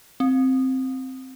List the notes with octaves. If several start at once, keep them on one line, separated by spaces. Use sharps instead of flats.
C4